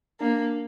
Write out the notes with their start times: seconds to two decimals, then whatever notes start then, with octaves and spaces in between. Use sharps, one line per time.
0.20 A#3 D4